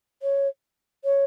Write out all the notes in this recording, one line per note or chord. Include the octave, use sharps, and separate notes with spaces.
C#5
C#5